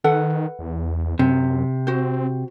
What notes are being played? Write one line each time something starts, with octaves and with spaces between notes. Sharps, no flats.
D#3 A4 B4 F#5
E2
F#2 C3
C4 F#4 C5